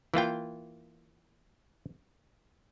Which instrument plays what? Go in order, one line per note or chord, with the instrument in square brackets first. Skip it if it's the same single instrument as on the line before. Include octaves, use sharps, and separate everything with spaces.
[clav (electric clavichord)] E3 A#3 F4 G5